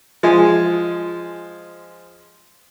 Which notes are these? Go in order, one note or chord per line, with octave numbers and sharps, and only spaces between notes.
F3 G#3 G#5